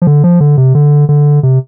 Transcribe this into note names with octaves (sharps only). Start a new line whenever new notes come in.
F3
D3
F3
D3
C3
D3
D3
C3